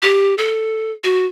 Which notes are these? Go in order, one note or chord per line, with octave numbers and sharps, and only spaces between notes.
G4
A4
F#4